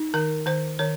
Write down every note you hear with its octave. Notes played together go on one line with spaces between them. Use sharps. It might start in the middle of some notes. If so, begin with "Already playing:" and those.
Already playing: D#4
D#3 A#4
D#3 C5
D#3 C#5